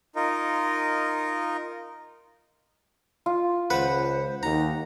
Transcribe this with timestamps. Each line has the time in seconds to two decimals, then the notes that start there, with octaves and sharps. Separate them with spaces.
0.16 D#4 F4 A#4 D#5
3.26 F4
3.70 C#2 B4 C5 F#5
4.43 D#2 D#4 A#5